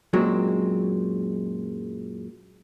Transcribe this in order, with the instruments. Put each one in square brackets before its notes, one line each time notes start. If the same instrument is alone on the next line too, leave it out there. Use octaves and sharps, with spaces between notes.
[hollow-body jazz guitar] F#2 A#2 F#3 G#3 C4